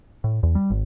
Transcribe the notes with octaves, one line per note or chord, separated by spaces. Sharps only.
A2
E2
G3
G#1